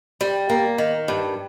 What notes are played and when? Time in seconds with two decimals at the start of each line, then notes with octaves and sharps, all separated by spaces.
0.21 G3
0.50 A#3
0.78 D#3
1.08 G2